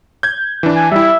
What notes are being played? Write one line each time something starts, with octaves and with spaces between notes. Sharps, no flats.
G6 G#6
E3 D4
G#5
G3 E4 E5